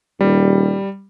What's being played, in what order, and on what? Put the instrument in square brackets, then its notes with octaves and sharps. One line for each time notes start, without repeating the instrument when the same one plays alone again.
[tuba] D#1 [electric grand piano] G3